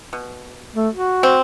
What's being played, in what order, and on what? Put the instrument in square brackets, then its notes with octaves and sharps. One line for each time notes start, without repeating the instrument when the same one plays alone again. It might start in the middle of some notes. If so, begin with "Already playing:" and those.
[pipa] B2
[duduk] A3
F#4
[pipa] C4